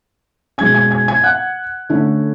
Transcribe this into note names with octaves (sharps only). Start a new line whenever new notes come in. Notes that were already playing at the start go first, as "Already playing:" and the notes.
B2 G#3 C#4 G#5 G#6
G#5 G#6
G#5 G#6
G#5 G#6
F#5 F#6
D3 A3 C#4